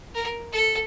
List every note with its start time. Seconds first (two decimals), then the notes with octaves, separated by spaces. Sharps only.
0.15 A#4
0.53 A4